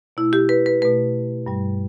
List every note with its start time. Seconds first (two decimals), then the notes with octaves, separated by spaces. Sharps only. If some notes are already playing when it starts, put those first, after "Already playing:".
0.17 B2 A3 E4
0.33 G4
0.49 B4
0.66 B4
0.82 B2 A3 B4
1.46 G2 G3